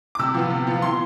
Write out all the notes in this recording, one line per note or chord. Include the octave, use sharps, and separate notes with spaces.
D6
C3 E6
F3 B3 F4
C3
F3 B3 F4
E3 C6